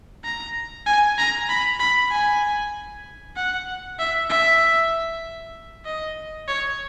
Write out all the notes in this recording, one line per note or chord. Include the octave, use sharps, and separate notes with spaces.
A#5
G#5
A#5
B5
B5
G#5
F#5
E5
E5
D#5
C#5